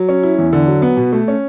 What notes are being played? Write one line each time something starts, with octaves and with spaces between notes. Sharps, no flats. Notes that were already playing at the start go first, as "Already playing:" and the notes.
Already playing: F#3
C#4
E4
E2
D3
F#3
B3
B2
A3
C#4